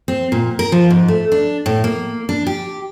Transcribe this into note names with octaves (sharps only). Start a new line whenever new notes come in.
C4
A#2
A#4
F3
G#2
A3
D4
A2
A#3
D4
G4